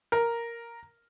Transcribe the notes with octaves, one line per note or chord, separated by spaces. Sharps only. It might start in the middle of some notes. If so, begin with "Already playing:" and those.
A#4